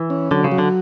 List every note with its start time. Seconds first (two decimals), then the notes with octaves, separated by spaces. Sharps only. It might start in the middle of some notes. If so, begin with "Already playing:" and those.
Already playing: E3
0.10 C#4
0.31 D3 F#3
0.44 C#3
0.52 F#3
0.58 D3